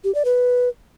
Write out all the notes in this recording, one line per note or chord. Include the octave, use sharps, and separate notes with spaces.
G4
D5
B4